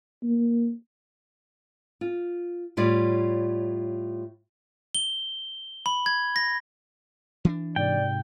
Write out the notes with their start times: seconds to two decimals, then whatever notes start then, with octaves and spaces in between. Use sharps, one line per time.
0.23 A#3
2.01 F4
2.77 A2 G3 F4 C#5 D5
4.95 G7
5.86 B5
6.06 G#6
6.36 A#6
7.45 E3 C#4 D4
7.76 G#2 C3 D5 G5